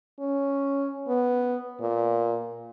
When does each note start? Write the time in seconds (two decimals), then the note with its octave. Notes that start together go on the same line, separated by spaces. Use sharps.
0.20 C#4
1.08 B3
1.81 A#2